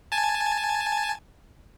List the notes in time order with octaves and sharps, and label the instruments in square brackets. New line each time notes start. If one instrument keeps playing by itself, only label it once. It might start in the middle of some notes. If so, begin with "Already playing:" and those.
[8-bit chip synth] G#5 A5